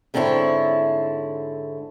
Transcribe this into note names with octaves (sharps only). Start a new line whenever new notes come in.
G#2 D3 C4 E4 B4 C#5